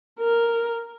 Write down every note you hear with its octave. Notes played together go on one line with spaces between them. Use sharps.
A#4